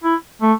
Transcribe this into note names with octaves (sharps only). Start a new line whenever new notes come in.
E4
A3